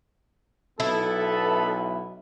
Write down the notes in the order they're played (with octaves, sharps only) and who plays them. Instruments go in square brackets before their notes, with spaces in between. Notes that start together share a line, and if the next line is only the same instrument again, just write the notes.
[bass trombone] B1 [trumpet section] B3 B4 B5 [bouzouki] E4 [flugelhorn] A4